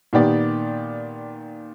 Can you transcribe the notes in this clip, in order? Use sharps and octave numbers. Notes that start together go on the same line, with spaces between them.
A#2 D#3 B3 G4 D5